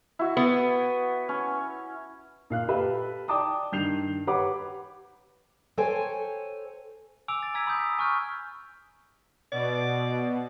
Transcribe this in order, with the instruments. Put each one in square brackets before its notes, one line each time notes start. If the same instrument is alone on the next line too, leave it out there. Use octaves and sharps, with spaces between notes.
[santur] E4 F#4
[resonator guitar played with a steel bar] B3
[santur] C#4
[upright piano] A#2 F5 F#6
G4 A4 B4 E5 F5 B5
D5 G5 A5 D6 D#6
G2 D#3 G6 C7 F7
G4 B4 C#5 F#5 B5 D6
[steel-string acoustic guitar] A4 C5 C#5 G5 G#5
[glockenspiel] G#5 D6 E6 D7 F7
A6
G#5 A#5 E6 G#6 B6
B5 D#6 G6
B6
G#5 C#6 F6 G6
[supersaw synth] B2 [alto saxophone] D5